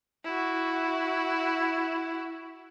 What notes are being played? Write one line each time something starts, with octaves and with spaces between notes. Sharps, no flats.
E4 F#4